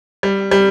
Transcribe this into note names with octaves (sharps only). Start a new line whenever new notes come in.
G3
G3